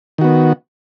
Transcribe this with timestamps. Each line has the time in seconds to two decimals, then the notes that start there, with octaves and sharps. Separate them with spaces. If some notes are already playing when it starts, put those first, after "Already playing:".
0.18 D#3
0.21 F#4
0.24 B3